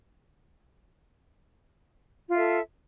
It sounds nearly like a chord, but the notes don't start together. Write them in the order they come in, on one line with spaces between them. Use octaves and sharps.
F4 E5 A4